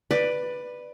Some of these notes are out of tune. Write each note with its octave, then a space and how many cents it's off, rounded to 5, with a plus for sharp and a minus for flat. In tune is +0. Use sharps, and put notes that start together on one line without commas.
B4 +0 D5 +15